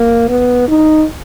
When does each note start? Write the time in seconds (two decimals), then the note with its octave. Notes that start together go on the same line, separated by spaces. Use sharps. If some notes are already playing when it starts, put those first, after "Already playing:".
Already playing: A#3
0.29 B3
0.68 D#4